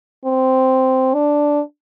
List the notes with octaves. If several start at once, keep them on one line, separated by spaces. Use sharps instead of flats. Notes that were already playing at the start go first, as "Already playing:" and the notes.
C4
D4